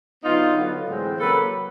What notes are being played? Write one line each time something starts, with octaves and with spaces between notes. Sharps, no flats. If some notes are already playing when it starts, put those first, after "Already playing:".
D3 F#3 B3 D#4 F4
D3 F#3 B3
A2 E3 G#3 C4
C#3 F#3 A#3 A4 B4